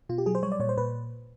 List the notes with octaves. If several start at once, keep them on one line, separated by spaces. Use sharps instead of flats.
B2 F4
G4
F#3 G#4
C5
G3 C#5
D5
A#2 C#5
C5
A#2 B4